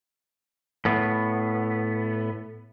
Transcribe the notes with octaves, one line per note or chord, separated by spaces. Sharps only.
A2 B3